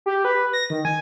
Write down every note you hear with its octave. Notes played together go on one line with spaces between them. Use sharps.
G4
B4
A#6
D#3
G#5